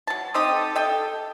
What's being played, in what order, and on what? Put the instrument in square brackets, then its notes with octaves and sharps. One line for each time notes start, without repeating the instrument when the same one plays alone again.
[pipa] F#3 A5
[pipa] C4 D#4 G4 [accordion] D#6
[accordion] A4
[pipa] D#5 G5